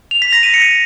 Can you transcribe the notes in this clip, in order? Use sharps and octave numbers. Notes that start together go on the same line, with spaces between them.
F7
B6
A#6
D#7
C#7